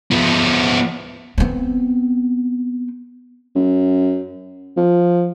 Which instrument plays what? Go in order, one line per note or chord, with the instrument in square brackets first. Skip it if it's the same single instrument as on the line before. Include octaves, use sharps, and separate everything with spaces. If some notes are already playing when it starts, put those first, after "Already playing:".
[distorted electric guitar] F3 B3
[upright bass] B3 C4
[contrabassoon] F#2
F3